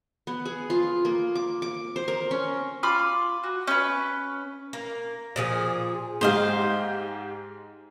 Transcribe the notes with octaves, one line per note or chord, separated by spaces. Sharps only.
B3
G#4
F4
A#3
D6
D6
C5
A#4
C#4
F4 B5 D6 F6
F#4
C#4 B4
A#3
A#2 F3 G#4
G#2 G#3 G4 C5 D#5 F5